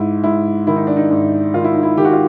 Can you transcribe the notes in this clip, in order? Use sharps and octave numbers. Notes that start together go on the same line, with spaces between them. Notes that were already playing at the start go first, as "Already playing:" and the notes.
Already playing: G#2 E4
G#2 E4
D#3 E4
D#4
D4
D#4
G#2
D#3 F4
E4
D#4
E4
D#3 G4
F#4
F4